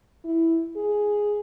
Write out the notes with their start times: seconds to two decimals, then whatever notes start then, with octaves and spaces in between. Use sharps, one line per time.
0.25 E4
0.77 G#4